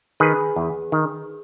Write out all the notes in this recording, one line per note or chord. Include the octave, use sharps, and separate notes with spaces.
D#3 G#4 B4
E2
D#3